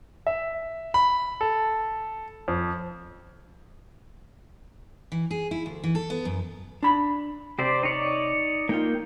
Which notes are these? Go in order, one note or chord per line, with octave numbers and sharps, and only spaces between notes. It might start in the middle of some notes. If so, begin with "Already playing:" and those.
E5
B5
A4
F2
E3
G#4
E4
D2
E3
A4
B3
F#2
D4 B5
C3 G4 C5 D5
D#4 C#5 D5
A#3 D#4 F4 G5